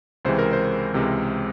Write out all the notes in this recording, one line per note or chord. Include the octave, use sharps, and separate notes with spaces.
C#2 C3 E3 G#3 C5
A#4
C5
C#2 C3 E3 G#3